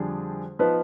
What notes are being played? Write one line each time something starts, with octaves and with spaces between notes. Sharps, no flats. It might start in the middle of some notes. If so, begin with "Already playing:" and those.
Already playing: F2 D3 G3 D4 G#4
F3 B3 D#4 B4